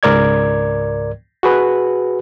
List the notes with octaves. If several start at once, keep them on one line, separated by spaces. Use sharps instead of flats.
C#2 G#2 A#4 D5 G#6
F#4 G#4 B4